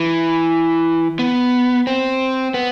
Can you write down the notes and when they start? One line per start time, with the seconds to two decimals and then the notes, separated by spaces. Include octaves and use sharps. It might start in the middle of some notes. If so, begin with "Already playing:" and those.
Already playing: E3
1.19 B3
1.87 C4
2.54 B3